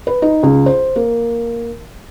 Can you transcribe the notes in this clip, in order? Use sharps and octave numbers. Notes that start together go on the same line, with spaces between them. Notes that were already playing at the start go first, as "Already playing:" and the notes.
B4
D#4
C#2
C5
A#3